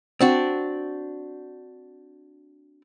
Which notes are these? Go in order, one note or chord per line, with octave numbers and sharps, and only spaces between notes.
C4 D4 F#4